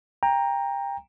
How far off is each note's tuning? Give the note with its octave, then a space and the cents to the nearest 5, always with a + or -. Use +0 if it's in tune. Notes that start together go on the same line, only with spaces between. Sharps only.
G5 +25 A#5 +0